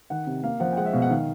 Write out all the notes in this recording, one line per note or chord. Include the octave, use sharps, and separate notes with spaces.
D#3 F#5
C3
A#3 F5
F3 F#5
G5
G#3 F#5
E5
B2 F5
F#5
D#3 F5